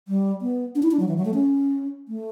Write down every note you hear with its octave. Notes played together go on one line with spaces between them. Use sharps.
G3
B3
D4
E4
D4
F#3
E3
F#3
A3
C#4
A3